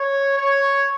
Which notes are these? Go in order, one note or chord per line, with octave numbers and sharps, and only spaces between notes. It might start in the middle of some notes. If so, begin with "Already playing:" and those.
Already playing: C#5
C#5